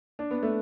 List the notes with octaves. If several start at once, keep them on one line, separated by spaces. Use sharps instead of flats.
D4
B3
A3